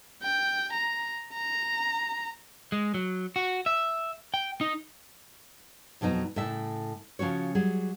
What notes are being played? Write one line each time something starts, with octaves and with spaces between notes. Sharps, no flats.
G5
A#5
A#5
G#3
F#3
F#4
E5
G5
D#4
F2 B2 F#3 D#4
A2 C#3 E5 A5
C#3 F3 C#4 F#4 C#5
F#3 G3 G#4